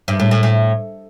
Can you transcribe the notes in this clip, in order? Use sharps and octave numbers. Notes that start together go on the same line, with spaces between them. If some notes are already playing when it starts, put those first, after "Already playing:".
G2
A2
A2
A2